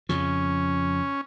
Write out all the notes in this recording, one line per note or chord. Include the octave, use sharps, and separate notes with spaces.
F2 C#3 F3 C#4